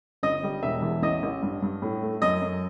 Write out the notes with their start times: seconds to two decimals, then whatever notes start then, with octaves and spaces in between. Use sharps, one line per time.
0.23 G1 D#5
0.43 G3
0.63 E1 E5
0.82 E2
1.03 A1 D#5
1.23 A1
1.42 G2
1.62 G2
1.82 A2
2.02 A3
2.22 F#2 D#5
2.42 F#2